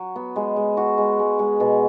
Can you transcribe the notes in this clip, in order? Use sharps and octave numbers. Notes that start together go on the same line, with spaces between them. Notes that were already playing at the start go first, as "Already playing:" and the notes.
Already playing: F#3
B3
G#3
G#3
F#4
G#3
G#3
G#3
B2